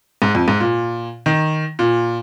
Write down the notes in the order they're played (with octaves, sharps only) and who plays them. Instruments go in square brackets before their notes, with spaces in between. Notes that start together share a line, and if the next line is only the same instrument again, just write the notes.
[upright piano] G#2
F2
G#2
A#2
D#3
A#2